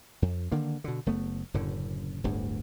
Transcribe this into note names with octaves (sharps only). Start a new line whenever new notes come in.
F2
D3 D#3 A#3
B2 D3
F#1 A3 B3
F#1 F#2 A2 D3
D1 G1 D2 G2